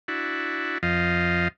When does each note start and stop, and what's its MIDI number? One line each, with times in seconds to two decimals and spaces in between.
0.08 0.78 62
0.08 0.78 64
0.08 0.78 66
0.83 1.48 41
0.83 1.48 53
0.83 1.48 75
0.83 1.48 77